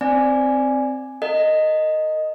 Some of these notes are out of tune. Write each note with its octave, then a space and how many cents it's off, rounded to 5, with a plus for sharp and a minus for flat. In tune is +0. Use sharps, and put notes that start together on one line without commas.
C4 +0 D5 +0 G#5 +0
A#4 -40 D#5 +0